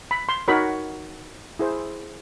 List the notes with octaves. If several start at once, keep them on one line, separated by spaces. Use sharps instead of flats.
B5
C6
D#4 F#4 A#4 C#5 B5
E4 G#4 C5